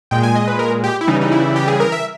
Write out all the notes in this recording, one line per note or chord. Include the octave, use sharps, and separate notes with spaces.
A#2 G#3 G5
G#5
D#5
B4
A#4
G4
E4
C#3 E3 G3 D#4
D#4
E4
G4
G#4
A#4
E5